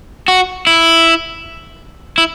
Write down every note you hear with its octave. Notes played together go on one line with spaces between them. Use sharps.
F#4
E4
E4